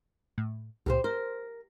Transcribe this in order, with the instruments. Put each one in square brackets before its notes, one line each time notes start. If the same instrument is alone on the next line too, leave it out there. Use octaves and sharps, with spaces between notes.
[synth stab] A2
[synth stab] C#2 A#2 [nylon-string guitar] G4 A#4 C5
[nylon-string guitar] A#4 [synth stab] C5